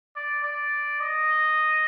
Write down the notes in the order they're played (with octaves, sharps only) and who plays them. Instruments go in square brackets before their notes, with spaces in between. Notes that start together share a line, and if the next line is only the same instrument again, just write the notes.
[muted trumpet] D5
D5
D#5